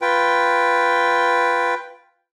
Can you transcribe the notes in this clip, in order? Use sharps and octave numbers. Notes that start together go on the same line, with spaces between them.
F4 B4 G5